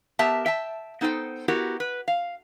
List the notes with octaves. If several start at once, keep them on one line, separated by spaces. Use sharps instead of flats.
B3 G4 A#4 E5 A5
E5 G5 A5
B3 D#4 A4 C5 G5
B3 E4 F#4 G4 A#4
B4
F5